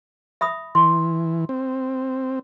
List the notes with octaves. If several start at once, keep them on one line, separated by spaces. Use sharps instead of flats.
E5 B5 D#6
E3 C6
C4